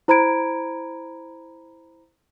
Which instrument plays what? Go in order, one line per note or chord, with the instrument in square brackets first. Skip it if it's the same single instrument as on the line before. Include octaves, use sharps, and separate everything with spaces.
[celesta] E4 C5 A#5 B5 G#6 D7